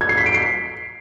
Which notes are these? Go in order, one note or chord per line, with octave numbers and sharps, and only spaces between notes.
G#6
C7
B6
D7
C7